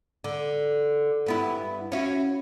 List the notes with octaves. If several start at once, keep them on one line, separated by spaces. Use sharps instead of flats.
D3
G2 B3 E4
C#4 E4 F#4